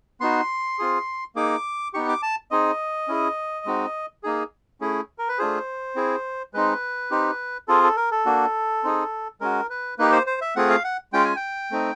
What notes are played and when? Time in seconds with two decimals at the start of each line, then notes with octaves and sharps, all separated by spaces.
0.21 B3 D#4 F#4 C6
0.79 C4 F4 G#4
1.36 A#3 D#4 G#4 D6
1.94 B3 D#4 G4 C#6
2.08 D6
2.22 A5
2.51 C4 D#4 G#4 D#5
3.08 C#4 E4 G#4
3.66 G#3 C4 D#4 F#4
4.23 A#3 D#4 G#4
4.81 A3 C#4 E4 G#4
5.18 A#4
5.28 B4
5.38 A3 D4 F4 G#4 C5
5.96 C4 E4 G#4
6.54 G#3 C4 D#4 B4
7.11 C4 D#4 G4
7.68 C4 F4 G#4 A4
7.83 A4
7.97 A#4
8.11 A4
8.26 A#3 D4 F#4
8.83 C4 D#4 G#4
9.41 G#3 C#4 F#4 A#4
9.70 B4
9.98 A#3 D#4 G4 B4
10.12 C5
10.27 C5
10.41 E5
10.56 A3 C4 F4 G#4 F#5
10.70 F5
10.84 F#5
11.13 G#3 C#4 F4 G5
11.24 G#5
11.36 G5
11.71 A3 C4 D#4